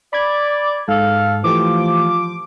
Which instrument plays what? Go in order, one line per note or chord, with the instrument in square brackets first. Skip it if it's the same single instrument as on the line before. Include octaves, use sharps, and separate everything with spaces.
[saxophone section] D5 [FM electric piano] B5 D6 G#6
[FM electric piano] G#2 [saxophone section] A4 F5
[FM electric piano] E3 A3 G4 [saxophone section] F3 [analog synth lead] D6